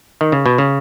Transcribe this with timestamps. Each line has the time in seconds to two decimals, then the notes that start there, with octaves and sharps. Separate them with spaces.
0.21 D#3
0.32 C#3
0.46 B2
0.58 C#3